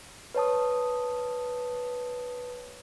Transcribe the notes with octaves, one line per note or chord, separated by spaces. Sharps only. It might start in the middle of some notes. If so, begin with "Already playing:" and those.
B4 C#5 A5 D#6